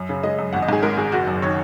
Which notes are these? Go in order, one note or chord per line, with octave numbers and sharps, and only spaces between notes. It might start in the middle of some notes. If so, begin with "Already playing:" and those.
Already playing: F#2
C#3
G#3 D#5
F#2
G#1 F#5
D#5
G#2 G#4
G#3 A#4
G#1 G#4
F#1 F#4
F#2
D#3 C#5